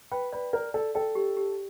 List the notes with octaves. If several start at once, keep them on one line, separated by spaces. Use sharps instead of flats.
B4 G5
B4 D5
A#4 D5
A4 D5
A4 G5
G4
G4